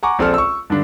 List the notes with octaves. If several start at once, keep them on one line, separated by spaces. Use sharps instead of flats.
F#5 G#5 A#5 C#6 D6
A#1 C4 A4 F6
C#6 E6
G2 D3 D4